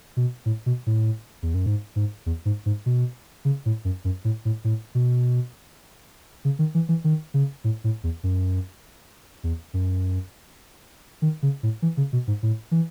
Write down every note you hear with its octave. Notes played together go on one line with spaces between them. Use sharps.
B2
A2
B2
A2
E2
F#2
G#2
G#2
E2
G#2
G#2
B2
C#3
A2
F#2
F#2
A2
A2
A2
B2
C#3
D#3
E3
E3
D#3
C#3
A2
A2
E2
F#2
E2
F#2
D#3
C#3
A2
E3
C#3
B2
G#2
A2
E3